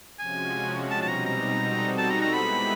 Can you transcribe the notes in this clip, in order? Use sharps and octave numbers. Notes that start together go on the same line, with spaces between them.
C3 F3 G#3 C#4 F#4 G#5
B2 G3 C4 D#4 A5
A5
A#5
A#5
G3 C4 D#4 F#4 A4
A5
A#5
A#5
G#3 B3 E4 G4 B4 B5